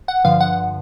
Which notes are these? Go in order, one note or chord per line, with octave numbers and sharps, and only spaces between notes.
F#5
G2 D3 F3 F5
F#5